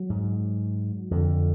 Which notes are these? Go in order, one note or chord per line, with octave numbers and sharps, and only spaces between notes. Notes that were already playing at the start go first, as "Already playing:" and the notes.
Already playing: F#3
G#2
F2 D3